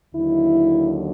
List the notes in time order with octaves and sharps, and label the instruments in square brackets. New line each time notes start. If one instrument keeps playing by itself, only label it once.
[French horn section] D#2 D3 F#3 E4